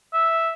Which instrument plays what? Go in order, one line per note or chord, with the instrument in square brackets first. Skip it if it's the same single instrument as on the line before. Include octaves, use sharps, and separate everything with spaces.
[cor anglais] E5